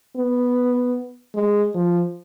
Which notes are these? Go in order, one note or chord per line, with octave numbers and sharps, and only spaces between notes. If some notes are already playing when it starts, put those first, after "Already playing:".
B3
G#3
F3